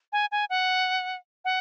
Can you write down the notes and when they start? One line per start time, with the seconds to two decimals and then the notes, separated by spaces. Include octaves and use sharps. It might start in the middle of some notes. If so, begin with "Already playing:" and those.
0.13 G#5
0.32 G#5
0.50 F#5
1.45 F#5